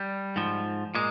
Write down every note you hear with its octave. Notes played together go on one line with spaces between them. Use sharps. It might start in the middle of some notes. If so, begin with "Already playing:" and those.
Already playing: G3
G#2 F3
A#2 G#3